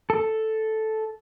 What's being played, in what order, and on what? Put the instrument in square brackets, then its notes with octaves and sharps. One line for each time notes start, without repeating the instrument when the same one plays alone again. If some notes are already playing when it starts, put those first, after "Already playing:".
[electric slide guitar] A4